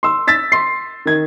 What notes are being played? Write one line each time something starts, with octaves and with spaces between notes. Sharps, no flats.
C6 E6
E6 A6 B6
C6 C7
D#3 G#6